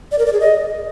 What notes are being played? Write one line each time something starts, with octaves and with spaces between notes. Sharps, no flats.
D5
A#4
D5
G#4
D#5